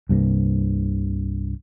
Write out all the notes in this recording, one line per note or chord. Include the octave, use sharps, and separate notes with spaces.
C2 G2 C3 A#3